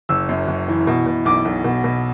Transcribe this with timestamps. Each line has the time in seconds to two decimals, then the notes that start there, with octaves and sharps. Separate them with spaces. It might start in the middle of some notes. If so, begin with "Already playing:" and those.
0.09 F#1 E6
0.29 F#2
0.48 F#1
0.68 E3
0.87 B2
1.06 B2
1.25 B1 D6
1.45 B1
1.64 B2
1.84 B2